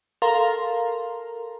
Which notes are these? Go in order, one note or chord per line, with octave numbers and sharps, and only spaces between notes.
A4 A#4 F5 A#5 C6